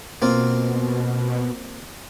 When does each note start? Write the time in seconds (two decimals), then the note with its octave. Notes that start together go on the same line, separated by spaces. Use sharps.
0.22 B2 A#3 C4 F4